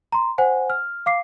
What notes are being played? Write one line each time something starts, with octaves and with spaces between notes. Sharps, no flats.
A#5 C6
C5 F#5 G#5
F6
F5 D6 C7